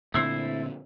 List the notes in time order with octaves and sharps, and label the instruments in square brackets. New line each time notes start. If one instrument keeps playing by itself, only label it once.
[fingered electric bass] A#2 D3 C4 [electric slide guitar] A3 E4 C5